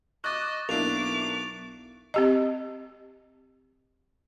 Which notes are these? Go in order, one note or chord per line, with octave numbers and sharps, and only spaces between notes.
D#5 C#6 D6 F#6 A6
B1 A#3 D4 E4 D6 F7
C4 G4 D#5